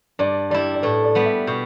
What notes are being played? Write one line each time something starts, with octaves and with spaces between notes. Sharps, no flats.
G2 D5
G3 E4 D5
D5
A2 B4
D5
G3 B3
E5
B2 G6